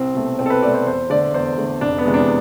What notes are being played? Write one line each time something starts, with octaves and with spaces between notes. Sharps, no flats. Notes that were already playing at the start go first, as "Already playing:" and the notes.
Already playing: C2 C4
B2 A3
C2 C4
A4
B4
B2 A3 D5
C5
E2 C5
D3 A3 D5
E2 C5
D3 A3
F1 D4
B3
E2 C3 E3 G#3
D4